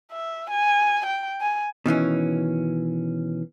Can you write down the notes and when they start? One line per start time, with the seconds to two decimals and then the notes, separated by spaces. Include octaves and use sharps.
0.12 E5
0.50 G#5
1.06 G5
1.41 G#5
1.86 B2 D#3 E3 C#4